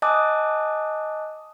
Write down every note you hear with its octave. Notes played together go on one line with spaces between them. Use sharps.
D#5 G#5 A5 D6 D#6 F#6